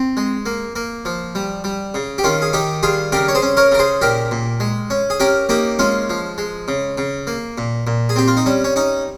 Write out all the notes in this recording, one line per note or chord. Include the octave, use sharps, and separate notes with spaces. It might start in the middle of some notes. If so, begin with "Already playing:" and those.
Already playing: C4
G#3
A#3
A#3
F3
G3
G3
C#3
G4
D#3 C#4 F4
G#4
D#3 D#4 G4
G3 F4 G#4
C#3 G4 A#4
C#5
G#4 C5
C#4
A#4 C#5
C#3 A#4
G#4 C5
A#2 G4 A#4
A#2
G#3
C#4
G#4
C#4 G4 A#4
A#3 D#4 G4
G#3 C#4 F4
F3
G#3
C#3
C#3
A#3
A#2
A#2
G#4
C4 G4
F4
D#4
G3 C#4
C#4
C#4 D#4